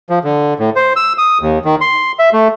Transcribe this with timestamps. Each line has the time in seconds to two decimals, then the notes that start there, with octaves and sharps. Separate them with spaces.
0.10 F3
0.24 D3
0.59 A2
0.76 C5
0.96 E6
1.18 D#6
1.41 D#2
1.65 D#3
1.81 C6
2.19 E5
2.33 A3